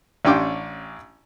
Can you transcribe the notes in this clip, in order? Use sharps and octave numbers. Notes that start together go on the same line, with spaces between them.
A1 C#4 D4 G5 C6 D6